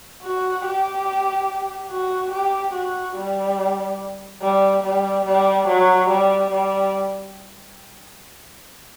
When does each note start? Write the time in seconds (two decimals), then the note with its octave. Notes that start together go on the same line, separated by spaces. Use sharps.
0.22 F#4
0.64 G4
1.90 F#4
2.32 G4
2.74 F#4
3.16 G3
4.42 G3
4.84 G3
5.26 G3
5.68 F#3
6.09 G3
6.51 G3